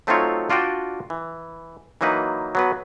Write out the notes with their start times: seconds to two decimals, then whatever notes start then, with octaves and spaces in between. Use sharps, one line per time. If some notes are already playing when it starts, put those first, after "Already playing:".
0.07 F#3 A3 C4 D#4 F4 C#5
0.50 D4 F4 F#4 D5 G5 A5
1.10 E3
2.01 E3 F#3 A#3 D#4 B4
2.55 F#3 B3 B4